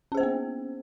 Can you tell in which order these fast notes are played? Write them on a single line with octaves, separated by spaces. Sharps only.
C#4 G#4 C5 A#3 B3